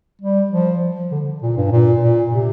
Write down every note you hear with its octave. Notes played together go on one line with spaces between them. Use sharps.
G3
F3
D3
A#2
G2
A#2
A#2
C3